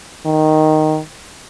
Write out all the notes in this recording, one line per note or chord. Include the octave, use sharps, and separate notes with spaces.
D#3